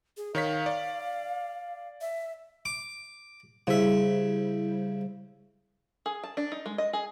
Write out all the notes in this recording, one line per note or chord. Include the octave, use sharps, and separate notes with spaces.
G#4
D#3 C#5 F5 B6
D5
E5
D6
C#3 G3 E4 C5 E5
G#4
A5
D4
D#4
G#3
D#5
G#4